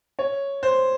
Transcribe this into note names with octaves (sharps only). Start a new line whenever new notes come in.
C#5
C5